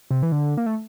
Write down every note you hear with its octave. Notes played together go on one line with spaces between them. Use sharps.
C3
E3
D3
A#3
A3